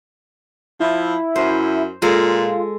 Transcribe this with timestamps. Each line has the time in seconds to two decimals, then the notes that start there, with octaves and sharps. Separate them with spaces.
0.80 F3 E4
1.36 F#2 C5
2.02 A#2 G#3 F4 A4